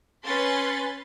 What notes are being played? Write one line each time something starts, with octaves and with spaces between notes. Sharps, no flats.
C#4 B4 C6 A6